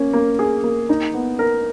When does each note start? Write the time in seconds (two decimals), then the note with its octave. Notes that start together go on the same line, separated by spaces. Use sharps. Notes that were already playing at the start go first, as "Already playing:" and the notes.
Already playing: A#3 C#4
0.13 A#3
0.39 G#4
0.64 A#3
0.89 D#4
1.14 B3
1.39 A#4